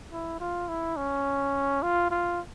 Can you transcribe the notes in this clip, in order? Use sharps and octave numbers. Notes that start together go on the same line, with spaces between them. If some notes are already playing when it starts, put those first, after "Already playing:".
E4
F4
E4
C#4
F4
F4